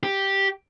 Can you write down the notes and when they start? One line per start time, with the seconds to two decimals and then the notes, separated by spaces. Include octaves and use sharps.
0.03 G4